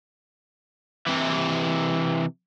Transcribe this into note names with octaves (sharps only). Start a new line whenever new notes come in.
C3 E3